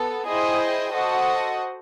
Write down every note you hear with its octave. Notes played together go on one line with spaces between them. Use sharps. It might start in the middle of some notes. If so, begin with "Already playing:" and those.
Already playing: B3 A4
E4 G#4 C5 D#5 G5
F#4 A4 C5 D#5 F#5